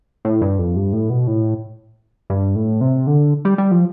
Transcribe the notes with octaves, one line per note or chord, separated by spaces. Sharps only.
A2
G2
F2
G2
A2
B2
A2
G2
A2
C3
D3
G3
G3
F3